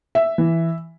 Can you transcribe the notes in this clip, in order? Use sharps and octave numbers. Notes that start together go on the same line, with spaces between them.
E5
E3